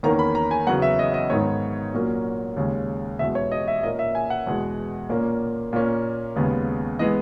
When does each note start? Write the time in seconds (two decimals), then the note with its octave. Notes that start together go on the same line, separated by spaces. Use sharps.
0.03 E2 D#3 A#3 C#4 A#5
0.19 B5
0.35 A#5
0.51 G#5
0.67 E2 C#3 F#3 B3 F#5
0.82 E5
0.99 D#5
1.14 D#5
1.30 G#2 D#3 G#3 B3 C#5
1.93 A#2 F#3 A#3 C#4
2.56 D#2 C#3 G#3 C#4
3.19 E2 B2 G#3 E5
3.35 C#5
3.52 D#5
3.68 E5
3.83 A#2 A#3 C#4 D#5
3.99 E5
4.15 G#5
4.30 F#5
4.47 E2 B2 G#3
5.09 A#2 A#3 C#4
5.73 A#2 A#3 C#4
6.36 D#2 C#3 G#3 B3
6.99 E3 G#3 B3 D#5